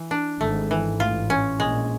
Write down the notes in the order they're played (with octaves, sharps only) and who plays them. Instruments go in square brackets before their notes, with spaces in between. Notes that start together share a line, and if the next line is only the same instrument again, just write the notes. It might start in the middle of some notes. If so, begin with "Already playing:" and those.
Already playing: [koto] E3
D4
[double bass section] G#1 G#2 [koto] A3
[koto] E3
[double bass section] A1 A2 [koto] F4
[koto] C#4
[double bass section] A#1 A#2 [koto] G#3